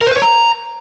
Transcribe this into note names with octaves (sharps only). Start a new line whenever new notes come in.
A#4
C5
B4
C#5
A#5